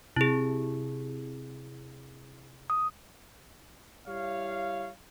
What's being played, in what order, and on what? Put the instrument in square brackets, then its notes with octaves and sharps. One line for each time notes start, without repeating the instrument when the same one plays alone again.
[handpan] C3 [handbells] E4 G#4
[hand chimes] D#6
[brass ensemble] G3 E4 C#5 F5